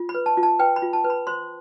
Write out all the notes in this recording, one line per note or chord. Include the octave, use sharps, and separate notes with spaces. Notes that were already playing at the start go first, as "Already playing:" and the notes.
Already playing: F4
B5
B4
A5
F4
A5
B4 G5
B5
F4
A5
B4
B5
C5 C6